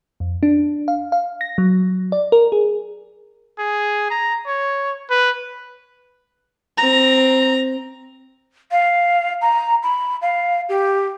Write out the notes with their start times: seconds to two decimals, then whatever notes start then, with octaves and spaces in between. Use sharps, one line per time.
0.20 F2
0.43 D4
0.88 F5
1.12 F5
1.41 A#6
1.58 F#3
2.12 D5
2.32 A#4
2.52 G#4
3.59 G#4
4.11 A#5
4.47 C#5
5.11 B4
6.78 C4 A#5
8.72 F5
9.42 A#5
9.83 B5
10.22 F5
10.69 G4